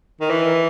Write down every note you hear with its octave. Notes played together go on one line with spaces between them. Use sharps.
D#3
E3